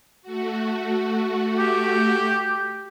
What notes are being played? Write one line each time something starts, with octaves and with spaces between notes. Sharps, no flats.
A3 F#4
G4